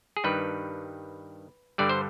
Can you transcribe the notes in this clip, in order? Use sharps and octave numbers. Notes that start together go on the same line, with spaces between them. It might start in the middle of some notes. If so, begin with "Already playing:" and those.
G#4
G2 D#3 G3 B4
G2 D3 G3 D5
C5